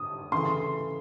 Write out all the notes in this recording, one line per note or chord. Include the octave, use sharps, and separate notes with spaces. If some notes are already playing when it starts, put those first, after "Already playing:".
Already playing: D#6
C#3 E3 A3 C6